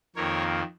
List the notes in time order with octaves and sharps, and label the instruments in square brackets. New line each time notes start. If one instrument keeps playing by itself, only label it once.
[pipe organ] F2 D#3 A#3 A#4 C#5